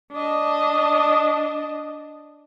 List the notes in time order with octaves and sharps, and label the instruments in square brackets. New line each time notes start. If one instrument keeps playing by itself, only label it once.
[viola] D4 D#5